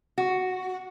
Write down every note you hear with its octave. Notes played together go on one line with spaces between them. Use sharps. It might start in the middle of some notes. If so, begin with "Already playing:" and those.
F#4